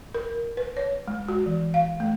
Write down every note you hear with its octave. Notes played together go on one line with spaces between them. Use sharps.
A#4
B4
C#5
G#3
F#4
E3
F5
A3